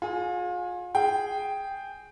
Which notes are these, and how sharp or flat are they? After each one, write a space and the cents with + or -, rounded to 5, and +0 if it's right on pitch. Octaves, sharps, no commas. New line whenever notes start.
F4 +35 G#4 +20 G#5 +0
G#4 +0 G5 +0